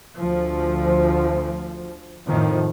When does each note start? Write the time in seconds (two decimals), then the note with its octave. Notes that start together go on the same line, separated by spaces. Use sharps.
0.19 D2 F3
2.27 F2 A2 D#3 F3